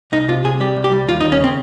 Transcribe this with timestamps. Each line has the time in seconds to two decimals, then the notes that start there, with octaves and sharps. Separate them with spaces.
0.12 C2 D#4
0.28 C3 F4
0.44 C3 G#4
0.60 G3 G4
0.76 C2
0.84 G4
0.92 G3
1.08 D#2 F4
1.20 D#4
1.24 D#2
1.32 C#4
1.40 C#3 C4